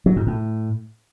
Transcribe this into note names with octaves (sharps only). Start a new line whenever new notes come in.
F#3
G#2
A2